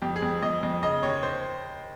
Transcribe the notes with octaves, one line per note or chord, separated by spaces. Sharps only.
F2 G4
G#4
F2
F2 D#5
F2
C#3 D#5
D#2 C#5
C5